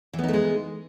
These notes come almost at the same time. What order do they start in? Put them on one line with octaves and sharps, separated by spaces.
E3 B3 D#4 A3 G#3